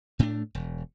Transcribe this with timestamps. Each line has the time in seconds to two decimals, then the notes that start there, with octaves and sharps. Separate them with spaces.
0.19 A2 A3 C4 D4
0.55 E1